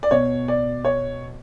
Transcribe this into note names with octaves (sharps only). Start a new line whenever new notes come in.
D5
B2 C#5
D5
C#5